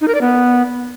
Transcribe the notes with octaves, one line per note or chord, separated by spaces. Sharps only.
D#4
A#4
D5
B3